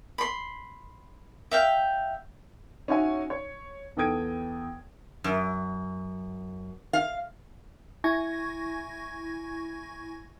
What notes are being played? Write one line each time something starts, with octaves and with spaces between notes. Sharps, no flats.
B5 C6
E5 F5 G5
C#4 D#4 F#4 C#5 E5 G#5
C#5
E2 A4 G5 D#6 G#6 D7
F#2
F5
E4 G#5 C#6 G#6 A#6